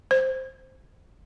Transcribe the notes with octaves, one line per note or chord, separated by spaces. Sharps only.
C5